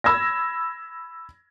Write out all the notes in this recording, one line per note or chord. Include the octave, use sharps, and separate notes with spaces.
B5 E6 G#6 A#6